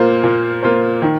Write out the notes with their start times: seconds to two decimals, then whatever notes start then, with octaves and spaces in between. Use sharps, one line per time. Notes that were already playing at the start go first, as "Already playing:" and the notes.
Already playing: A#2 A#3 F4 C5
0.23 A#2
0.63 A#3 F4 C5
1.02 D#3